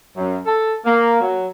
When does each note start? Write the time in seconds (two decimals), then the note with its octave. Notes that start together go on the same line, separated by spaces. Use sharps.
0.17 F#2
0.45 A4
0.85 A#3
1.21 F#3